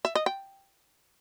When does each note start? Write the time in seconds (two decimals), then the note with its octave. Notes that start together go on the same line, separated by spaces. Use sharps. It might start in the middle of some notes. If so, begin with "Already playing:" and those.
0.05 E5
0.15 D#5
0.26 G5